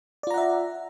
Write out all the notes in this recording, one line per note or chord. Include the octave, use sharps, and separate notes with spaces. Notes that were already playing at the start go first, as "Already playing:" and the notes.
F4 D5 E5 F#5 A#5